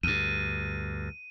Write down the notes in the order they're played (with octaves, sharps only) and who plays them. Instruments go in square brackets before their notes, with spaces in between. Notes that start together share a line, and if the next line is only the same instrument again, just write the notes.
[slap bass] D2 G2 [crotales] D#7